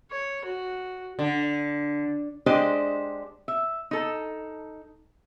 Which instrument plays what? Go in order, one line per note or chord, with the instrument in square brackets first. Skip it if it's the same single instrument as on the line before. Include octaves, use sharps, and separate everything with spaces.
[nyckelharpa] C#5
F#4
[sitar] D3
[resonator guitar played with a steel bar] G#3 D4 G4 C5 D5 D#5
E5
D#4 A4